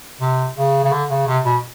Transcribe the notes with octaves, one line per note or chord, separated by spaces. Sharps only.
C3
C#3
C#3
D3
C#3
C3
B2